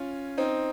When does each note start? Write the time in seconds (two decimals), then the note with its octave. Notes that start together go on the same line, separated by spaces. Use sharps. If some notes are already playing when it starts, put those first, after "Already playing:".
Already playing: C#4 F4
0.38 C4 D#4